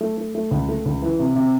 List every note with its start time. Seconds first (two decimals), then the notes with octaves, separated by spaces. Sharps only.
0.01 A3
0.18 A3
0.35 A3
0.51 C#2
0.69 A3
0.86 C#2
1.02 E3
1.19 C3
1.36 C3